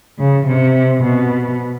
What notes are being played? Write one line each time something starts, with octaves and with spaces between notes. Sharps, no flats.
C#3
C3
B2